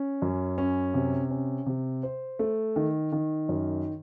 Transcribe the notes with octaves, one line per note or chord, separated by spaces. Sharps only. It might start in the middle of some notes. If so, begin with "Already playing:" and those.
Already playing: C#4
F#2
C#4
C3
C#4
C3
C5
A3
D#3
D#3
F#2